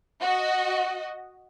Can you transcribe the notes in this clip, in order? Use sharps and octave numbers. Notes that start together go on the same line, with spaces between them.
F#4 D#5